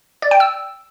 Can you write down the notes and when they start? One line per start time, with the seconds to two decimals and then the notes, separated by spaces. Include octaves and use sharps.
0.22 D5
0.31 G5
0.40 E6